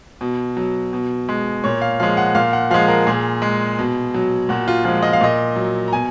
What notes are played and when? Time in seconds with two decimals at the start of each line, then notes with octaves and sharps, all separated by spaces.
0.21 B2
0.57 F#3
0.93 B2
1.29 G#3
1.64 A#2 C#5
1.82 F5
2.00 F3 G#3 F5
2.17 F#5
2.35 A#2 F5
2.53 F#5
2.71 F3 G#3 F5
2.88 A#4
3.07 A#2 G#4
3.42 G#3
3.79 B2
4.14 F#3
4.49 A#2 F#4
4.68 F4
4.85 F3 G#3 F4
5.03 D#5
5.13 F5
5.21 A#2 D#5
5.56 F#3
5.88 A#5
5.92 B2 G#5